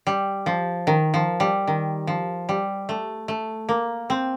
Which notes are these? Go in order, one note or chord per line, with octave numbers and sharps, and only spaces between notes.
G3
F3
D#3
F3
G3
D#3
F3
G3
A3
A3
A#3
C4